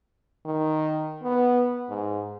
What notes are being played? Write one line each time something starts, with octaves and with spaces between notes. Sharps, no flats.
D#3
B3
G#2